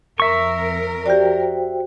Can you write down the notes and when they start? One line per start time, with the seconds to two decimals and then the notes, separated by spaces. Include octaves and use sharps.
0.20 F2 A#4 E5 C#6
1.06 F#4 G4 C5 D5 G5